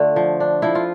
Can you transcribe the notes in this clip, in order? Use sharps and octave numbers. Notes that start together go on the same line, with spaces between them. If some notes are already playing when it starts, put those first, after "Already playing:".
Already playing: D3 A3 F4
F3
D4
F3 E4
F4